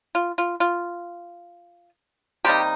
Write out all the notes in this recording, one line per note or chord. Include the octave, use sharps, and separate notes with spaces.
F4
F4
F4
C3 G3 A#3 D#4 G4